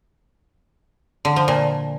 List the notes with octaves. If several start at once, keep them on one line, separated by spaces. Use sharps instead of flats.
D3
F3
A#2